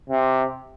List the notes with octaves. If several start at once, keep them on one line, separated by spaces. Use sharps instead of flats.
C3